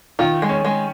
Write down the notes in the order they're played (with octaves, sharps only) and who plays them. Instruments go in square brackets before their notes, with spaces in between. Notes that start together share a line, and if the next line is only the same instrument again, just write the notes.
[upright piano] D#3 [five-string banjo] F4
[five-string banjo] G#3
[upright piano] C#4
[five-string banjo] G#3